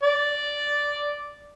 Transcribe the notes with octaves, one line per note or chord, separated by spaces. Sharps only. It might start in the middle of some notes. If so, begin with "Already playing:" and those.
D5